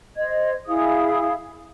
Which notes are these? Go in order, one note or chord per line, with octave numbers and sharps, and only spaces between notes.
C5 D#5 G#6
E4 G#4 F5 D#6